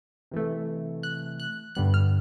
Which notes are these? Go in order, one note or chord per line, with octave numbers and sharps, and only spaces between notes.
C3 E3 A3
F#6
F#6
G2 D3 G3 B3 F#6
F6